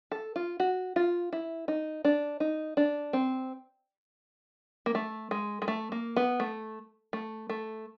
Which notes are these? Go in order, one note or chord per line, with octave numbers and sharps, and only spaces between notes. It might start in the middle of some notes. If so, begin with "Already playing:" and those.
A4
F4
F#4
F4
E4
D#4
D4
D#4
D4
C4
A#3
A3
G#3
G#3
A3
A#3
B3
A3
A3
A3